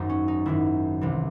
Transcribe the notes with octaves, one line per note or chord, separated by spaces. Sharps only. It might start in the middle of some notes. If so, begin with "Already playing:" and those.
Already playing: G#1 F#2 D#4
C#4
D#4
G#1 F#2 D#3 E4
C2 C3 E3